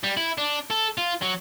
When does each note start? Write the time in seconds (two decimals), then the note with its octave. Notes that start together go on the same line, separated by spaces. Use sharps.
0.04 G3
0.17 E4
0.38 D4
0.70 A4
0.98 F4
1.22 F#3